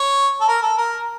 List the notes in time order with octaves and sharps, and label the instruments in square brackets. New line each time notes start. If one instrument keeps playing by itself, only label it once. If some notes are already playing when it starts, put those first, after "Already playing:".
Already playing: [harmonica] C#5
A4
A#4
A4
A#4